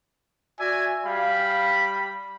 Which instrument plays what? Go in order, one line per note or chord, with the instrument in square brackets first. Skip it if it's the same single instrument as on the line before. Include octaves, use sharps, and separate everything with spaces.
[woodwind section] F#4 D5 E5 [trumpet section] G#5
[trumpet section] G3 B5 [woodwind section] F5